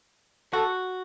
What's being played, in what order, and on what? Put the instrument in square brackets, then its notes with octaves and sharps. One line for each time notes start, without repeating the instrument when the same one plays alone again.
[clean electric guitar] F#4 [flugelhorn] A4